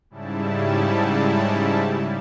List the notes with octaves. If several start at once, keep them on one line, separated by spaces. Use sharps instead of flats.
G#2 C#3 G3 E4 A5